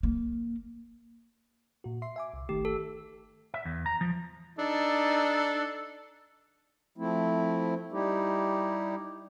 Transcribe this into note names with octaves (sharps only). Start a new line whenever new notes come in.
A#3
A#2 F#4
E5 C6 C7
E5 G#5 D6
C2
G1 D#3 A3 G4
A4
E5
E2
A#5
F3
D4 D#4 A4
F3 A3 C4 E4
G3 D#4 E4 G4